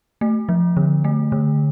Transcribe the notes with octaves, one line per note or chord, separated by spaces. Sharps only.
A3
F3
D3
A3
D3